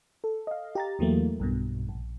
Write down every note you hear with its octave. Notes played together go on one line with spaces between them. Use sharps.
A4
D#5 F5
G4 A#5 A6
E2 E3 F#3 A3 A#3
B1 G2 B2
A#1